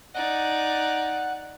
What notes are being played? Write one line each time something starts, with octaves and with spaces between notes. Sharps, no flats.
D#4 D5 F#5